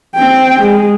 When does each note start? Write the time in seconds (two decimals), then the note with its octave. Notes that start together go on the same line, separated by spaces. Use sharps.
0.16 C4 G5
0.62 G#3